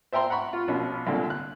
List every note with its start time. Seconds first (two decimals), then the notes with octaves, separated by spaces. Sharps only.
0.12 C5 E5 G5 A#5 C6
0.30 F#5 A#5 B5 C#6
0.53 F4
0.68 A#1 B2 C#4 F4
1.07 C2 A#2 D3
1.30 F#6